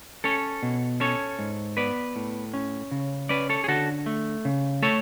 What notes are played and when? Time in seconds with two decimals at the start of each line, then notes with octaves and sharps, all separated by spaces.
0.24 C#4 A4 C#5
0.63 B2
1.00 C#4 A4 C#5
1.39 G#2
1.77 B3 B4 D5
2.16 A2
2.54 C#4
2.91 C#3
3.29 C#4 B4 D5
3.49 A4 C#5
3.64 G#4
3.68 D3 F#4 A4
4.06 A3
4.45 C#3
4.82 A3 A4 C#5